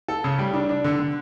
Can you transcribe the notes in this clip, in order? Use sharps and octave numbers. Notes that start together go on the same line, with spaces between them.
A4
C#3
G3
D4
D4
D3
D3